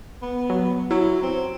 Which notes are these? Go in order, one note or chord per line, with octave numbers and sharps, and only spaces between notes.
B3
F#3
F#3 E4
C4